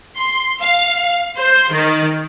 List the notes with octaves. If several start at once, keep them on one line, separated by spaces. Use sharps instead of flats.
C6
F5
C5
D#3